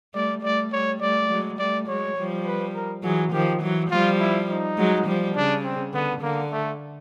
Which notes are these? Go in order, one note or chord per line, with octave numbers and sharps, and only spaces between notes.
G3 A3 D5
G3 A3 D5
G3 A3 C#5
G3 A3 D5
F#3 G#3
G3 A3 D5
F#3 G#3 C#5
F3 G3
B4
A#4
E3 F#3 G#4
D#3 F3 G4
E3 F#3
F3 G3 F4
E4
D#4
F#3 G#3
F3 G3
C#3 D4
C4
D3 B3
D3 A#3
A3